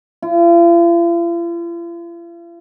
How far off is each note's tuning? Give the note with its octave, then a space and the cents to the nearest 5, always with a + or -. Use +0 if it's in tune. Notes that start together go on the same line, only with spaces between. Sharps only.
F4 -45